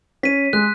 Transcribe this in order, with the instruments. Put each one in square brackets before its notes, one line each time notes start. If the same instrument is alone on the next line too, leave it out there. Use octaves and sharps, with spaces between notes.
[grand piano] C#4 C#5 [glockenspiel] B6 D#7
[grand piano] G#3 G#4 [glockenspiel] F#6